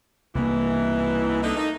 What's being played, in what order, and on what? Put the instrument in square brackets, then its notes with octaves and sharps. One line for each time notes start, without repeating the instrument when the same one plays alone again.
[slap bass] C2 A#3 [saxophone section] G#2 B2 E3
[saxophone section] D3 A3 D#4
A3 A#3 D#4